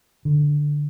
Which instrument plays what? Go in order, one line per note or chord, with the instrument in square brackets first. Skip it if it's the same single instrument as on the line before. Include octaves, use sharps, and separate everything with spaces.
[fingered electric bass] D3